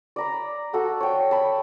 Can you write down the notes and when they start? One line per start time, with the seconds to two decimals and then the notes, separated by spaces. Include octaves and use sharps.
0.16 D5 A#5 B5
0.73 F#4 A4 F#5 B5
1.00 C#5 G5
1.31 A5 B5